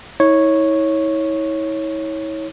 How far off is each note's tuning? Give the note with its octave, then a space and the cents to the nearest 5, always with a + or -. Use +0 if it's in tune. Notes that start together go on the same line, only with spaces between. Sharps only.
E4 -45 C#5 -5